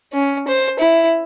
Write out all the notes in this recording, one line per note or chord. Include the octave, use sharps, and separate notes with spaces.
C#4
C5
E4